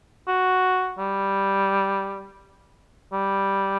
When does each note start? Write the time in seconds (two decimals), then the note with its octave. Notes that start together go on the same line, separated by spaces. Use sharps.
0.28 F#4
0.99 G3
3.13 G3